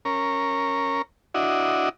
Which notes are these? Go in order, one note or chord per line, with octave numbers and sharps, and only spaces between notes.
C#4 A#4
D4 E4 F#4 D#5